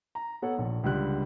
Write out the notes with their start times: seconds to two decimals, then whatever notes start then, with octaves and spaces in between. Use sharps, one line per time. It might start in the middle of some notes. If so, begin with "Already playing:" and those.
0.15 A#5
0.42 B3 A4 C#5 F#5
0.58 A#1
0.84 C#2 D3 G3 F#6